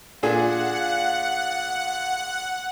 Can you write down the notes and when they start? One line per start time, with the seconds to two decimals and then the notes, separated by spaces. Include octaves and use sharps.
0.23 A#2 D4 G#4 F5 F#5